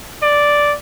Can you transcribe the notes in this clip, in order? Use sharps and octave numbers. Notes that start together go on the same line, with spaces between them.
D5